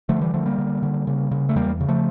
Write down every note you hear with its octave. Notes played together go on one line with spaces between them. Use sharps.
D3 F3 A3
E3 G3
D3 F3 A3
G3 A#3
D3
D3
C#3
C#3
A3
E2 G3 A#3
C#3
F3 A3